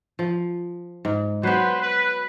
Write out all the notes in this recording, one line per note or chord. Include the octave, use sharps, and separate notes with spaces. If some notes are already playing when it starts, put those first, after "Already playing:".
F3
G#2
F#3 B3 B4 C5
B4